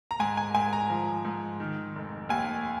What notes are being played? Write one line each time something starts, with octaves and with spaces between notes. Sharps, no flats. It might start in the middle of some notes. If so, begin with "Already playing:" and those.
A#5
G#2 G#5
G#5
G#2 G#5
A#5
F3
G#2
D#3
F1
D#2 G#5